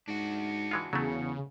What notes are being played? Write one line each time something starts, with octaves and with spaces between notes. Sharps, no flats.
G#2 D4 F#4
E3 G#3 F4
E2 C#3 F#3 A3